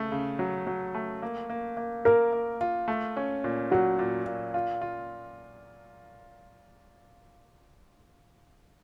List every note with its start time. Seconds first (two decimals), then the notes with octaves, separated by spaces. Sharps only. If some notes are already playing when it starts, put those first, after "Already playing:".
Already playing: C#3 A3
0.12 C#3
0.39 F#3
0.67 F#3
0.95 A3
1.22 A#3
1.50 A#3
1.77 A#3
2.05 A#3 A#4
2.33 A#3
2.61 F4
2.88 A3
3.17 C#4
3.44 A#2
3.71 F#3 F#4
3.99 A#2
4.26 A#2
4.54 F4
4.81 F4